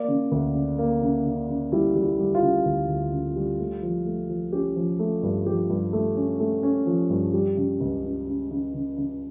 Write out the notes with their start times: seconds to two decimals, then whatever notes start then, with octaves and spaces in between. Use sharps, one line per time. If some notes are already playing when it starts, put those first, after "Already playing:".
Already playing: A#3 D5
0.08 C#3
0.32 D2
0.55 C#3
0.78 A#3
1.02 C#3
1.25 C#3
1.49 C#3
1.72 G3 E4
1.96 G3
2.03 E4
2.19 G3
2.35 F4
2.42 C#3
2.66 D2
2.89 D2
3.12 C#3
3.36 G3
3.59 A3
3.83 F3
4.06 A3
4.29 F3
4.52 C#4 G4
4.76 F3
4.99 A3
5.23 G2
5.46 F3 G4
5.70 G2
5.93 A3
6.16 C#4
6.40 A3
6.63 C#4
6.86 F3
7.10 G2
7.33 G3
7.57 C#3
7.80 C#2
8.04 C#3
8.27 C#3
8.50 C#3
8.74 C#3
8.97 C#3